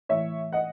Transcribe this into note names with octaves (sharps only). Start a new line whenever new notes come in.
A2 E3 C#5 E5
D#5 F#5